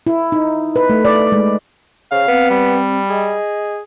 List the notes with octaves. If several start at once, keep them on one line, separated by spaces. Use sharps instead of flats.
E4
D#4
B4
A3
D5
G#3
C#3 C5 F5
B3 C4
G3
G#4 D#5